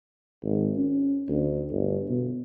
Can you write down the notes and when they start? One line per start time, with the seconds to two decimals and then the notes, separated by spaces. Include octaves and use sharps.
0.44 G#1
0.77 C#4
1.28 D2
1.72 G1
2.09 B2